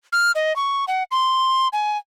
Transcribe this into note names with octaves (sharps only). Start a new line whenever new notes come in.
F6
D#5
C#6
F#5
C6
G#5